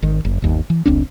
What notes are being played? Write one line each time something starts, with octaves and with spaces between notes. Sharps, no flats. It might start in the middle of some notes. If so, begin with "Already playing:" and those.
G#1 D#3
F#1
G1 D#2
E3
F1 C#2 C4 D4